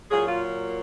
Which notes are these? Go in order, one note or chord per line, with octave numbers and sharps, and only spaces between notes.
A#2 F#3 A#3 G#4
F4